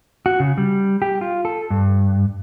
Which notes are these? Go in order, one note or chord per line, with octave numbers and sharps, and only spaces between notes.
F#4
C#3
G3
G4
F4
A4
G2